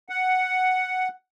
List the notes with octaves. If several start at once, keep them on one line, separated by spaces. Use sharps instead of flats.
F#5